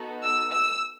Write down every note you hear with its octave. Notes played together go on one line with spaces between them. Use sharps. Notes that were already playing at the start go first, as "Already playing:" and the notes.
Already playing: B3 D#4 F#4 A4
E6
E6